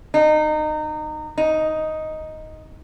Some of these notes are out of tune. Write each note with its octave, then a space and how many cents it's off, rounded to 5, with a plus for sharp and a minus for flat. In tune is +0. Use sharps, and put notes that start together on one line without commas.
D#4 -25
D#4 +5